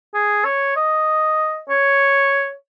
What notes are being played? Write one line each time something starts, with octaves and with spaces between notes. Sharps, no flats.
G#4
C#5
D#5
C#5